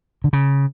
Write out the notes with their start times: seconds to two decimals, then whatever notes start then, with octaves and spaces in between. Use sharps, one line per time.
0.24 D3
0.33 C#3